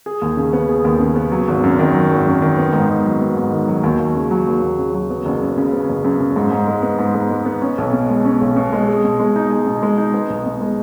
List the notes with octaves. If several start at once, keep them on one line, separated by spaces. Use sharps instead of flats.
G#4
D#2
C#3
B3
G#4
D#2
C#3
B3
F#3
G#1
F#2
D#3
F#3
G#1
F#2
D#3
B3
G#2
D#3
F#3
B3
G#2
D#3
F#3
D#2
D#2
C#3
F#3
D#2
D#2
C#3
F#3
B3
F#1
F#2
C#3
B3
F#1
F#2
C#3
G#2
G#2
G#3
B3
G#2
G#2
G#3
B3
C#4
B1
B2
G#3
C#4
B1
B2
G#3
G#4
B2
G#3
D#4
G#4
B2
G#3
D#4
B3
B1
B2
G#3